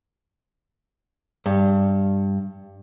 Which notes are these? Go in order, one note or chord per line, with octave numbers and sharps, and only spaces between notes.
G2